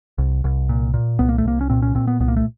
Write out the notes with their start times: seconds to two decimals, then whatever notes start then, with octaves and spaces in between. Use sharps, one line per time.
0.18 C2
0.44 C2
0.69 A#2
0.94 A#2
1.19 C2 B3
1.29 A#3
1.38 A3
1.45 C2 A#3
1.61 C#4
1.70 A#2 C4
1.82 C#4
1.95 A#2 C4
2.08 B3
2.20 C2 B3
2.28 A#3
2.37 A3